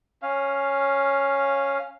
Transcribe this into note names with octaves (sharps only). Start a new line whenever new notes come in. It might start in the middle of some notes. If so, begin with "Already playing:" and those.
C#4 F5